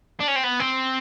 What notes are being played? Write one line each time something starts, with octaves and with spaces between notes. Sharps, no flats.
D4
C#4
C4
B3
C4